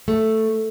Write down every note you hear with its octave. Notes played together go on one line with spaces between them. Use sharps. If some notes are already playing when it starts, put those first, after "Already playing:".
A3